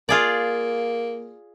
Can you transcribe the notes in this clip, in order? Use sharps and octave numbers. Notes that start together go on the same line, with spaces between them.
A#3 F4 G#4 D5